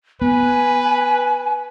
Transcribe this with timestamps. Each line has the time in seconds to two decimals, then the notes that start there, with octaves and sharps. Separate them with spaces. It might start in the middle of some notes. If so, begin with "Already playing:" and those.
0.22 B3 B4 G#5